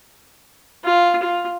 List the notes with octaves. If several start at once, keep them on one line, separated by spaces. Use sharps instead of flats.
F4
F4